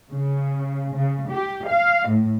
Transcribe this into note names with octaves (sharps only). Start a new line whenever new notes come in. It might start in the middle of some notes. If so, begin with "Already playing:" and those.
C#3
C#3
G4
F5
A2